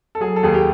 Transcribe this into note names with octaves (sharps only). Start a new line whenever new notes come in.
A4
F#3 G#4
A4
D#2 G#4
G4